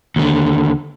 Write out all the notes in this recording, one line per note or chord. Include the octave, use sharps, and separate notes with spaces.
D#2 D3